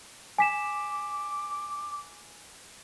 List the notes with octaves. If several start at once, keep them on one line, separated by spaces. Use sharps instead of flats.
G#5 D6 B6 E7